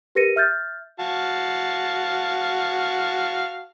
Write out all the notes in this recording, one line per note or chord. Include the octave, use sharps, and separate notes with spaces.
G4 A#4 B4 A#6 C#7 D#7
E5 F6 G6 A6
F#4 F5 A5